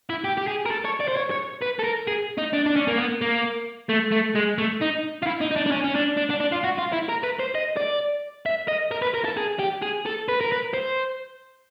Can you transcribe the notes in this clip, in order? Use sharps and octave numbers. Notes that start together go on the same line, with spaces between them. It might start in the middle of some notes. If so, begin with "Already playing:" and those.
E4
G4
G4
G#4
A#4
A4
C#5
D5
C5
C#5
C#5
B4
A4
A#4
G#4
D#4
D4
D4
C#4
A#3
B3
A#3
A3
A3
G#3
A3
D#4
F4
E4
D#4
D#4
D4
D4
C#4
C#4
D4
D4
D4
D4
F4
F#4
F4
E4
A#4
B4
C5
D#5
D5
E5
D#5
A#4
B4
A#4
A4
G#4
G4
G#4
A4
B4
A#4
B4
C5